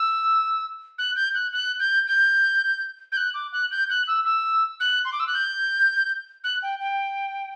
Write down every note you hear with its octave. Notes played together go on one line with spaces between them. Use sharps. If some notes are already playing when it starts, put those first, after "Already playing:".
Already playing: E6
F#6
G6
F#6
F#6
G6
G6
G6
F#6
D6
F#6
G6
F#6
E6
E6
F#6
C6
D6
E6
F#6
G6
F#6
G5
G5